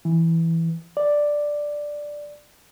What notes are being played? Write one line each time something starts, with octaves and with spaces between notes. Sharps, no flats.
E3
D5